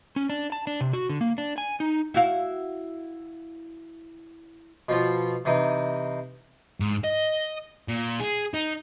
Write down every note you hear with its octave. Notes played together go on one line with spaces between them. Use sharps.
C#4
D4
A5
D4
C3
F#4
D3
A#3
D4
G#5
D#4
E4 F#4 F5
B2 F3 F4
C3 E3 D#4
G#2
D#5
A#2
G#4
D#4